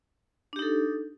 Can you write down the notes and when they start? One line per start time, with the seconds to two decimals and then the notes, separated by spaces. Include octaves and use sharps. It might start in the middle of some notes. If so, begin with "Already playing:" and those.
0.53 D4
0.56 G4
0.59 D#4
0.62 A4